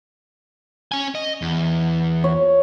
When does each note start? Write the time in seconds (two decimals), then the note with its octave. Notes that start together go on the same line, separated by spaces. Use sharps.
0.92 C#4 G#5
1.15 D#5
1.42 E2
2.24 C#5